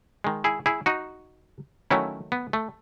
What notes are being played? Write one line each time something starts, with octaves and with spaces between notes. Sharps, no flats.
D#3 G#3
E4 G#4
E4 G#4
D#4 F#4
D#3 F#3 A3 C#4 E4
B3
A3